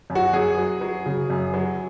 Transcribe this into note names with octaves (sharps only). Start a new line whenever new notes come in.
F#2
F#4
F#2 G#4
F#3
F#3
C#3
F#2
F#3